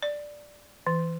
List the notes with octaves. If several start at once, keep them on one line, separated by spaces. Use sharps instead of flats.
D5
E3